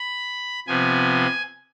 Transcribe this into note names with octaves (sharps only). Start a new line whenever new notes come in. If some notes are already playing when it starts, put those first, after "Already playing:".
Already playing: B5
C3 F3 B3 G#5